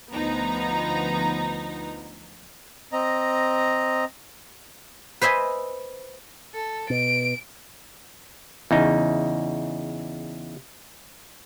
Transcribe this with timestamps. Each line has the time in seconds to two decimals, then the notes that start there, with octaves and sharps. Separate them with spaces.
0.12 D2 F3 B3 D#4 A#5
2.92 C4 D#5 A#5
5.22 B4 C5 D#5 E5 G#5
6.54 A4
6.90 B2 D7
8.71 E2 C#3 D#4